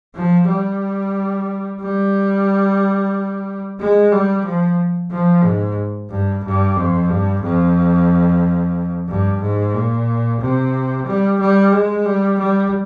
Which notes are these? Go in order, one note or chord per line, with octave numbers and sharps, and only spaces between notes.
F3
G3
G3
G#3
G3
F3
F3
G#2
G2
G2
F2
G2
F2
G2
G#2
A#2
C3
G3
G3
G#3
G3
G3